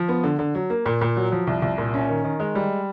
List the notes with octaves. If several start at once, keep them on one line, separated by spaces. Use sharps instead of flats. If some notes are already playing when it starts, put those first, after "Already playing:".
Already playing: F3
B3
D3
D3
F#3
A#3
A#2
A#2
F#3
F3
C2
C2
A#2
C#4
D#3
D#3
G#3
G3